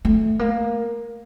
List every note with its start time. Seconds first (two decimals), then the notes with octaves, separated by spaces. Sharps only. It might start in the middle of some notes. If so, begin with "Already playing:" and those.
0.05 A3
0.39 A#3